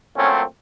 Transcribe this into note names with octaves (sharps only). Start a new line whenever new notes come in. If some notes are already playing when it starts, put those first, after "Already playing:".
A#2 F#3 A3 C4 C#4